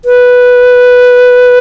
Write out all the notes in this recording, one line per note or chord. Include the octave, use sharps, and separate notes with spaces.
B4